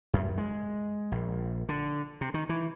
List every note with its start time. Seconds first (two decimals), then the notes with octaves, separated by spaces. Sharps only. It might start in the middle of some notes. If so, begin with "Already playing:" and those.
0.13 F#2
0.38 G#3
1.12 A#1
1.69 D3
2.21 C3
2.34 D#3
2.49 E3